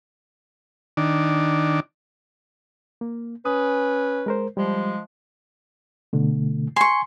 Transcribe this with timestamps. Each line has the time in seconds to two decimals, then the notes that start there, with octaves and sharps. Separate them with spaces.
0.97 D#3 D4
3.01 A#3
3.45 C#4 B4 D#6
4.26 G#3 A#4 C5
4.57 F3 G3 G#3
6.13 B2 D3 A3
6.76 G#5 C6 C#6